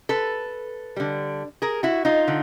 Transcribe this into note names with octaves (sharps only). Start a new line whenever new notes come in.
A4 B4
D3 G3
G#4 A#4
E4 F#4
D#4 F4
D3